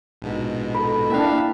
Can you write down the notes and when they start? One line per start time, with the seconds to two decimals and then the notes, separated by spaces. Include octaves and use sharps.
0.22 A#1 G#2 B2
0.75 A4 B5
1.10 A#3 D4 E4 E5 F5 G5 F#6